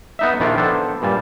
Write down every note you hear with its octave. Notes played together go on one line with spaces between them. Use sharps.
B3 D#4 E5
A#1 D#3 D4 E4 F4 A#4
B3 D4 A4 C5
G2 A#2 G3 A5